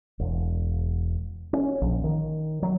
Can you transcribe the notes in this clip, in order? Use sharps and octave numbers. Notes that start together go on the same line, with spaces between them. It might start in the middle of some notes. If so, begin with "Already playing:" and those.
E1
C#4
A#1
D#3
F#3